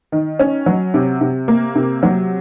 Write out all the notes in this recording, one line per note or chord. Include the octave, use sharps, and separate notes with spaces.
D#3
C#4
F#3
C3
C3
A#3
C3
F#3